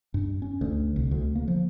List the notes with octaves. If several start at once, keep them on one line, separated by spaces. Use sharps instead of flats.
G2
C#4
D2
C2
D2
A#3
F3